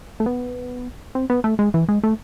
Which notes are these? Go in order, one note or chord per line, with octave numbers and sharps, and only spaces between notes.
A3
B3
C4
B3
A3
G#3
E3
G#3
A3